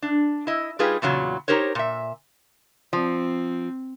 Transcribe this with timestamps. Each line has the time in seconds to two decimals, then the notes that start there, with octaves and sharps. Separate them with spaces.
0.02 D4
0.47 E4 D#5
0.79 G3 D#4 F4 G4 G#4 B4
1.02 E2 A#2 C#3 F#3
1.48 D#4 G4 A#4 C5 C#5
1.75 A#2 E5
2.93 F3 C4